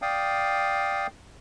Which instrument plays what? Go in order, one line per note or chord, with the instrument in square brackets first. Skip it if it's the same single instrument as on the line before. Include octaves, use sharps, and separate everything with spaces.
[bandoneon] D5 F5 G5 D#6